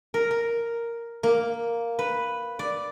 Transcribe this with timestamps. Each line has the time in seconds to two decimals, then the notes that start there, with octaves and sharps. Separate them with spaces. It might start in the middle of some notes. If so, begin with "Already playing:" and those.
0.14 A#4
0.31 A#4
1.23 A#3
1.99 B4
2.59 D5